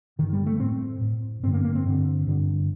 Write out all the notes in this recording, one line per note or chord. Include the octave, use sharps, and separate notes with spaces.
G2 D3 D#3
G3
A3
A2 C4
A2
G2 D3 C4
A#3
A#3
C4
G2 D3
G2 D3